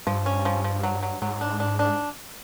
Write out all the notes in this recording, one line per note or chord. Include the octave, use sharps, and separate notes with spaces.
G2 F3
C#4
F3
F3
F#3
F#3
G#2 F#3
D4
D4
D4